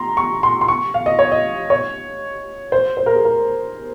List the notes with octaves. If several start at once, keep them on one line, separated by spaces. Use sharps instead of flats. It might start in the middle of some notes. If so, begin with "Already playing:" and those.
Already playing: A#5 C6
C#6
C6
C6
C#6
F5
D#5
C#5
D#5
C#5
C5
C5
A#4
G#4
A#4